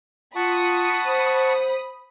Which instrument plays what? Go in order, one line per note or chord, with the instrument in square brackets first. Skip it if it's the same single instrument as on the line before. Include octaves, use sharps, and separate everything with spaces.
[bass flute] F4 [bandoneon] F#5 A5 C#6 [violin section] B5 D#6
[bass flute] C5